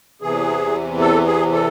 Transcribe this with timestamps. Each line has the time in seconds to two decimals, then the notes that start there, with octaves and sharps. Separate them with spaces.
0.22 E2 C3 E3 G#4
1.00 A4
1.26 G#4
1.52 A4